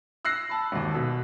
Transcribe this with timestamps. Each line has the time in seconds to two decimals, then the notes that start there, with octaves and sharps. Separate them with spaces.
0.25 E6 F#6 A#6 C7
0.49 A5 B5
0.72 G#1 D#2
0.94 B2